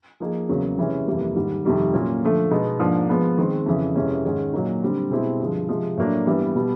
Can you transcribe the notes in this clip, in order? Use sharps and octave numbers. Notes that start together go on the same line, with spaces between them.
F3 A#3 D#4 G#4
E2 C#3 F#3 A#3
C3 E3 G#3 C#4
F2 C3 E3 G3 A#3
G#2 D#3 G3
F2 C3 D#3 G3
A#2 F#3 A#3 C#4 F4
D3 F3 A3
B2 G#3 B3 D#4
G#2 F3 A#3 D4
F3 G#3 B3
D#3 G#3 C4
F2 C#3 E3
F2 C3 E3 G#3 C#4
G#2 D#3 G#3 C#4
A#2 F#3 A#3 D#4
D3 G3 C4
B2 G#3 C4 E4 G4
G2 D3 F3 G#3
C3 F3 G#3
A2 F#3 A#3 D4
G2 E3 G3 B3
B2 G3 B3